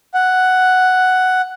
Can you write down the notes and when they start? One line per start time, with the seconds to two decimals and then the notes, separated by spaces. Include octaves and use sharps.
0.14 F#5